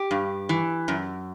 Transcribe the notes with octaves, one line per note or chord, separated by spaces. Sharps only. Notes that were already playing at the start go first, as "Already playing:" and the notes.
Already playing: G4
G2
E3
F#2